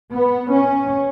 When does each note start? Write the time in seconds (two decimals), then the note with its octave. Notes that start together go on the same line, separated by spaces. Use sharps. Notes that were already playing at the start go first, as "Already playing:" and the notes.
0.15 B3
0.54 C#4